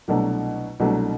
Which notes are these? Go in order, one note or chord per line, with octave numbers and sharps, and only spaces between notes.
C2 B2 F#3 A3 D4
C2 B2 F#3 A3 D4